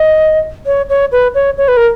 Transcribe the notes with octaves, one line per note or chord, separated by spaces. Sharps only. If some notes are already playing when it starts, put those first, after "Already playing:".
Already playing: D#5
C#5
C#5
B4
C#5
C#5
B4
A#4